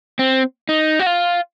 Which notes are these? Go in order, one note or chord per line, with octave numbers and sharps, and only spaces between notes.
C4
D#4
F#4
F4